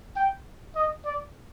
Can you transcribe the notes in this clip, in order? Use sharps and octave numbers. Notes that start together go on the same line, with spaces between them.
G5
D#5
D5